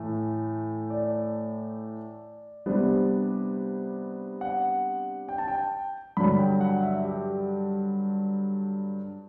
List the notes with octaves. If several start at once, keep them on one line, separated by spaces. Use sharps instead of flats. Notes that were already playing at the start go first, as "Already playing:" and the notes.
Already playing: A2 E3 A3
D5
C3 G3 B3 D4
F#5
G5
A5
G5
G2 D3 F#3 B5
G5
F#5
E5
G4